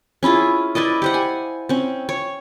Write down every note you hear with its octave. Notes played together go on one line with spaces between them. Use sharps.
C#4 E4 F4 G#4
E4 B4 D5 D#5
G4 C5 F#5
G#5
C4 C#4
C#5